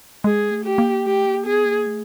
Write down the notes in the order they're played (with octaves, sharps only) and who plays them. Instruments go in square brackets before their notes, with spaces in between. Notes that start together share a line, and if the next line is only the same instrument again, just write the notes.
[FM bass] G#3 [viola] G#4
[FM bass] A3
[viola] G4
[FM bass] A#3
[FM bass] A3 [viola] G4
[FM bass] A#3
[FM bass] B3 [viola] G#4
[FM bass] A#3
A3